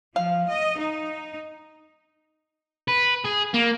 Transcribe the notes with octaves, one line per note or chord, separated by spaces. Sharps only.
F3 F5
D#5
D#4
B4
G#4
A#3